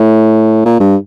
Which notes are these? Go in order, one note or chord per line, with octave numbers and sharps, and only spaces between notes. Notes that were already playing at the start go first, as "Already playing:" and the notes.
Already playing: A2
A#2
G2